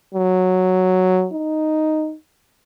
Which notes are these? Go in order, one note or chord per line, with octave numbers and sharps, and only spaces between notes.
F#3
D#4